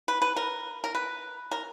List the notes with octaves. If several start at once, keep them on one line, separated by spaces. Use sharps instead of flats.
B4
B4
A#4
A#4
B4
A#4